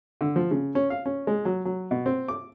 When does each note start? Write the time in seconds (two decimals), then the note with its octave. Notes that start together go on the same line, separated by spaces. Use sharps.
0.21 D3
0.36 F3
0.51 C#3
0.75 C#4
0.90 F5
1.06 C#4
1.27 G#3
1.45 F#3
1.65 F#3
1.91 B2
2.06 C4
2.28 D6